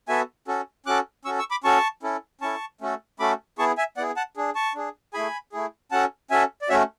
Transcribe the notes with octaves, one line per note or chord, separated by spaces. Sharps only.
B3 F#4 A4 E5 G#5
C#4 F#4 A4
C#4 F#4 A4 D6 F#6
C#4 F#4 A4 C#6 E6
C#6 E6
B5 D6
C#4 F#4 A4 A5 C#6
C#4 E4 A4
C#4 E4 A4 A5 C#6
A3 C#4 F#4 A4
A3 C#4 F#4 A4 B5 D6
B3 E4 G#4 A5 C#6
E5 G#5
B3 E4 G#4 D5 F#5
F#5 A5
D4 G#4
A5 C#6
D4 G#4
A3 E4 G#4 G#5 B5
A3 E4 G#4
C#4 F#4 A4 F#5 A5
C#4 F#4 A4 E5 G#5
D5
A3 C#4 F#4 C#5 E5